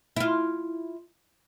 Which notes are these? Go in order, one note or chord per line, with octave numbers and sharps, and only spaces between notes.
E4 F4